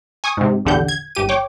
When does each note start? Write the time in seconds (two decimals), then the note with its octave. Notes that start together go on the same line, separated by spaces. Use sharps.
0.24 G#5 C#6 D#6
0.37 G#2 C3
0.65 A#1 E2 D3 G4 F#5 G6
0.88 G#6
1.15 G1 G4 D#7
1.29 C#5 G5 D6